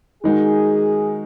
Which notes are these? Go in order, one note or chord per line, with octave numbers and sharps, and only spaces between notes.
D#3 G#3 D#4 F#4 G#4